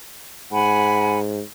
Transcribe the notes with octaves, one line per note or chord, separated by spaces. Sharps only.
G#2 F#5 G#5 B5